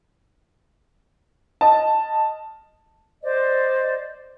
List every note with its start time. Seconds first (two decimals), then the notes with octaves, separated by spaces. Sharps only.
1.61 D#5 A5
3.23 C5 D5 D#5